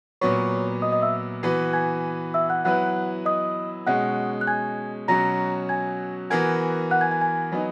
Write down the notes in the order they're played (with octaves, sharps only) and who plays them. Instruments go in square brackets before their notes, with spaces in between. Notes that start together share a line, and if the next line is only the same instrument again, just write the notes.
[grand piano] A#2 F#3 B3 [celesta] C#5 C#6
[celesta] D#5 D#6
D#5 D#6
E5 E6
[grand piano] E3 B3 F#4 B4
[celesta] G#5 G#6
E5 E6
F#5 F#6
[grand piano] F#3 B3 E4 B4 [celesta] F#5 F#6
[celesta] D#5 D#6
[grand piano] B2 G#3 C#4 [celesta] F#5 F#6
[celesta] F#6
G#5 G#6
[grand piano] B2 F#3 C#4 F#4 [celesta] A#5 A#6
[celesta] G#5 G#6
[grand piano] E3 B3 F#4 A#4 [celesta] G#5 G#6
[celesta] F#5 F#6
G#5 G#6
G#5 G#6
G#5 G#6
[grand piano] F#3 B3 D#4